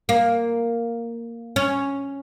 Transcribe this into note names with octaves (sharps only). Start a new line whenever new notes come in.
A#3
C#4